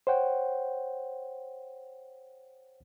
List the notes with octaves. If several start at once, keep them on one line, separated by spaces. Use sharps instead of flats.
C5 C#5 F#5 G5